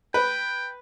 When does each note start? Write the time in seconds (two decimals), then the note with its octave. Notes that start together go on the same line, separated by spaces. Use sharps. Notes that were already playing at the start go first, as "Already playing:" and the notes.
0.14 B4 G5